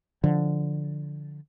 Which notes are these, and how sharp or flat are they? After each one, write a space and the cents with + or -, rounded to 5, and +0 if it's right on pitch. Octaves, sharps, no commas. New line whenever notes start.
D3 +0 F3 +0